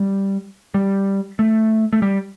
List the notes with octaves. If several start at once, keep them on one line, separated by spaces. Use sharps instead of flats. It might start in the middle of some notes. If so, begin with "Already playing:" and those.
Already playing: G3
G3
A3
A3
G3